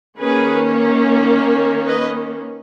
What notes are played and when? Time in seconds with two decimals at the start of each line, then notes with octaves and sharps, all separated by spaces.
0.19 D#3 A#3 C#4 G#4 B4
1.87 B4 D#5